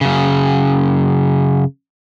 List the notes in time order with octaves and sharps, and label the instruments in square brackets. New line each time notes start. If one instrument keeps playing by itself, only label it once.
[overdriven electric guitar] F#2 C#3